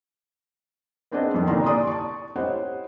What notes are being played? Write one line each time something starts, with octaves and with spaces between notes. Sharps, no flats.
B3 C4 D4 G#4 D#5 F#5
F2 D#3
G1 C2 A#2 E3 A#5 C6
D5 G#5 C6 D#6
A5 C#6
E4 G4 C5 C#5 D#5 F#5